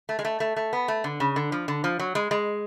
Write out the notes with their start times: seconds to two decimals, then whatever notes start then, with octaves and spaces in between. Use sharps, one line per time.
0.09 A3
0.19 G#3
0.25 A3
0.40 A3
0.56 A3
0.73 B3
0.88 A3
1.04 D3
1.20 C#3
1.36 D3
1.52 F3
1.68 D3
1.84 F3
1.99 F#3
2.15 G#3
2.31 G#3